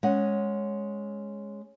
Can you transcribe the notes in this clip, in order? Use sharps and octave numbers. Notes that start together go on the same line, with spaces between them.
G#3 C#4 F#5